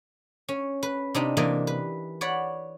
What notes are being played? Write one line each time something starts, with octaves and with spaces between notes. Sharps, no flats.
C#4
B4
C3 D4 D#4 G4
C3 E3 A#3 D5 D#5
B4
C#5 D5 F#5 B5